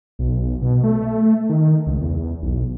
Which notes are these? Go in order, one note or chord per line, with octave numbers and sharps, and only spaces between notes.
B1
B2
A3
D#3
C#2
E2
B1